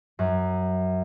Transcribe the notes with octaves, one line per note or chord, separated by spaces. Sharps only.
F#2